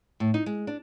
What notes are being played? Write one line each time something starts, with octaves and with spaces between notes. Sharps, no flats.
A2
D#4
G#3
D4